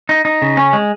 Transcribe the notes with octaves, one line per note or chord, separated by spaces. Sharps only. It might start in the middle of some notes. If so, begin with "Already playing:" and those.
D#4
D#4
C#3
C#4
G#3